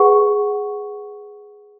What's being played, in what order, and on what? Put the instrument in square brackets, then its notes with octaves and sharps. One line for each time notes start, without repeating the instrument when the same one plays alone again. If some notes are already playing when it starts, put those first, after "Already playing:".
Already playing: [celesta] G#4 B4 F#5 C#6